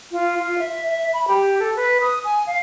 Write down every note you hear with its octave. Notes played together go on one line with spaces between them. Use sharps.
F4
F4
E5
E5
B5
G4
A4
B4
D#6
G#5
F5